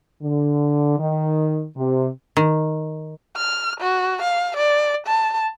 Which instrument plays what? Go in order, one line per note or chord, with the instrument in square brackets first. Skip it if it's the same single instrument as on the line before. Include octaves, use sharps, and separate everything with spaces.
[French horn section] D3
D#3
C3
[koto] D#3
[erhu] F6
F#4
F5
D5
A5